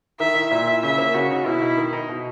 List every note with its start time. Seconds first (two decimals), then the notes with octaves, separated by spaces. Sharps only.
0.20 D#3 E5
0.35 E4
0.51 A#2 E5
0.67 E4
0.83 C#3 E5
0.98 A#3
1.14 C#3 F#4
1.30 D#4
1.46 B2 E4
1.62 D#4
1.77 D#3
1.93 D#4
2.09 B2